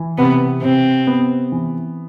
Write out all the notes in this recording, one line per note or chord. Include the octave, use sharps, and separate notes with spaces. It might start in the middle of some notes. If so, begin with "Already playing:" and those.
Already playing: E3
C3 B3
C3 C4
B3
E3